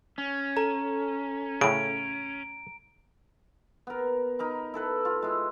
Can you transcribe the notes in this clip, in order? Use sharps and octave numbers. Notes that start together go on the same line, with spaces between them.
C#4
A4 A#5
A2 C#3 D7
B3 A#4
D#4 A#4 B5
E4 A4 B4
F4
G#3 E4